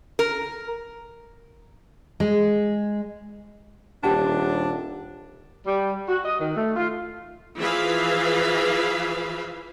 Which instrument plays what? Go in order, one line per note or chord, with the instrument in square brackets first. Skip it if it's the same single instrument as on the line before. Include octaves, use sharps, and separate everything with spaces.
[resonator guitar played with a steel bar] A#4
[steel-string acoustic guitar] G#3
[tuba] D#1 [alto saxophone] D4 [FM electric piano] G4 F#5 A5
[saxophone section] G3
F#4
D#5
D#3
A3
F4
[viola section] E3 F3 G#4 E5 F5 B5